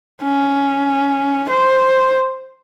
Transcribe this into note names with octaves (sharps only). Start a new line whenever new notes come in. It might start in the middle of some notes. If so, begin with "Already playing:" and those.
C#4
C5